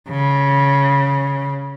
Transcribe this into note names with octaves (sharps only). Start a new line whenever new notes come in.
C#3